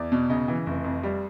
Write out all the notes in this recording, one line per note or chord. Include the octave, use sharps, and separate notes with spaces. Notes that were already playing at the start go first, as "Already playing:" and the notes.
Already playing: E2 D5
B2
C#3 D#5
E3
F1
F2
G3